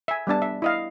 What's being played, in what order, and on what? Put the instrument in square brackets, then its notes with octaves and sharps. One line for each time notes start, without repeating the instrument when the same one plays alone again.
[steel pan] E5 G#5
G3 B3 D4 A5
E5
E4 D#5 F5